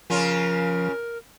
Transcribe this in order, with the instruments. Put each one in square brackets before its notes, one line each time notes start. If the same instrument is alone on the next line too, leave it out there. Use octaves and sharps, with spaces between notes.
[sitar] C#3 C#4 F4 [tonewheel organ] F3 [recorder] A#4